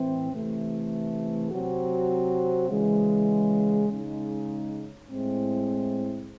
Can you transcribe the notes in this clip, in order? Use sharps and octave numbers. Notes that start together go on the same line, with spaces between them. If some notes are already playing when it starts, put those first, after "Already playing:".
Already playing: A2 E3 C4 E4
C3 E3 A3
C3 F#3 C4 F#4
C#3 E3 G#3
C#3 G#3 D#4
A2 G#3 C4 E4